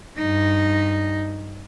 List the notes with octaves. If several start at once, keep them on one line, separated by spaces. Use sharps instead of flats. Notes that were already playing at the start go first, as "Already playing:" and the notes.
G2 D#4